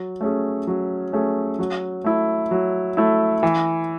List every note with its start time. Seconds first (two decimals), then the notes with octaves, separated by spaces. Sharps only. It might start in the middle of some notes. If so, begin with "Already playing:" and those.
Already playing: F#3
0.21 A3 C#4 G#4
0.67 F#3
1.13 A3 C#4 G#4
1.59 F#3
2.04 A3 E4
2.51 F#3
2.97 A3 E4
3.43 E3